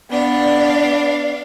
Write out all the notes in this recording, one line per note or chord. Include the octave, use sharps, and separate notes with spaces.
B3 D4 D5 F5